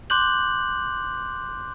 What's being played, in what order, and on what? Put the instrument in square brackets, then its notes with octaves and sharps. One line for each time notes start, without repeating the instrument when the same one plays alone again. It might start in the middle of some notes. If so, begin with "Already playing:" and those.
[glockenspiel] C6 D6 F#6 G6 F#7